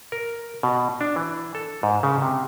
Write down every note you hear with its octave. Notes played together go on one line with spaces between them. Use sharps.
A#4
B2
D4
E3
A4
G#2
C#3
C3